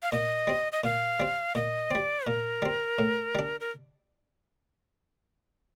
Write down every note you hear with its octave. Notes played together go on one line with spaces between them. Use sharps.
F5
A#2 D#5
G3 C4
D#5
A#2 F5
G3 C4
A#2 D#5
G3 C4 D5
A#2 A#4
G3 C4
A2
G3 D4
A#4